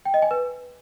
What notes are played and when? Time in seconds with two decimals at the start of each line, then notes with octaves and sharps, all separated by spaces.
0.05 G5
0.14 D#5
0.22 G#5
0.31 B4